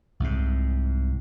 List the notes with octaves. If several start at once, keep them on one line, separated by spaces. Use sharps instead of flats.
C2 G#2